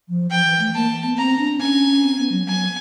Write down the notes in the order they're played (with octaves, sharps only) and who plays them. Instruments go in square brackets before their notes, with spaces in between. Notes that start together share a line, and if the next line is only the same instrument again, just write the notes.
[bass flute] F3
[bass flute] F3 [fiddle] G5
[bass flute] E3
A3
[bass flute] A#3 [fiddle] A5
[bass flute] B3
[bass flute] C4 [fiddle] A#5
[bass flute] D4
[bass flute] C#4 [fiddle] G#5
[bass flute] C4
B3
F#3
[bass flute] F#3 [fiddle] G#5